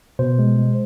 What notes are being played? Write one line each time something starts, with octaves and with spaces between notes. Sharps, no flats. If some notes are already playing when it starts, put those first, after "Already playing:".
B2 C5
G#3
G#3